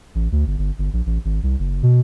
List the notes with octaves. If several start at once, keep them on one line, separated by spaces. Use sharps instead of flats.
A1
D2
G1
G1
G1
A#1
A1
G#1
C2
F#1
B2